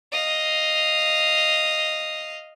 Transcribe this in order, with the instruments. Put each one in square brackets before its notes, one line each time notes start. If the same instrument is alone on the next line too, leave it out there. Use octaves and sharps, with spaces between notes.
[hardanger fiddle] D#5 F5